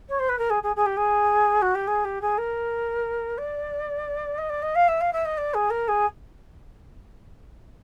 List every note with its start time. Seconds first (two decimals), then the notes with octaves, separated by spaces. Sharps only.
0.09 C#5
0.19 C5
0.29 B4
0.38 A#4
0.50 G#4
0.63 G#4
0.76 G#4
0.86 G4
0.97 G#4
1.62 F#4
1.75 G4
1.87 G#4
2.04 G4
2.21 G#4
2.38 A#4
3.38 D5
4.38 D#5
4.49 D5
4.62 D#5
4.75 F5
4.88 E5
5.00 F5
5.13 E5
5.25 D#5
5.37 D5
5.54 G#4
5.70 A#4
5.88 G#4